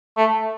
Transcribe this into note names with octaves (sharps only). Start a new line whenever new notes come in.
A3